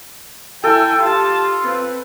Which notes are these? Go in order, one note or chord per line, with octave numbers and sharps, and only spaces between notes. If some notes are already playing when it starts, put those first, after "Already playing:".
E4 A4 G5 G#5
F4 G4 A5
C4 B4